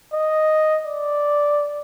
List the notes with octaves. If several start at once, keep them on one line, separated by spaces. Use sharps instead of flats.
D#5
D5